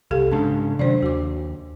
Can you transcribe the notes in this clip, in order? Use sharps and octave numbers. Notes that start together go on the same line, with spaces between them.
C2 G4 A4 F5
G#2 C#3 D4 A5
C3 D#3 F#3 D4 C5 D5
D#2 F#4 D6